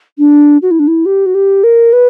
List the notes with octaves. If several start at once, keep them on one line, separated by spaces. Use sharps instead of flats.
D4
F#4
E4
D4
E4
G4
F#4
G4
A#4
B4